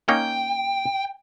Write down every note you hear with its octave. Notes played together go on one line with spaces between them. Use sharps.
A#3 C#4 D#4 G5